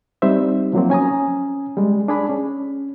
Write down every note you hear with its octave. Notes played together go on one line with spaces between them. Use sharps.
G3 C4 D#4 C5 E5
F3 F#3 A#3 C4
C#4 G#5 A#5 D#6
G3 G#3
D4 G#4 B5
C#4